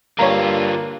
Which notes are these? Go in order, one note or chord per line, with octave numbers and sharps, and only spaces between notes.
G2 D3 A#3 F4 C#5 A#5